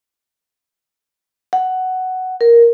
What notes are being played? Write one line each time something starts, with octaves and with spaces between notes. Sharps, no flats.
F#5
A#4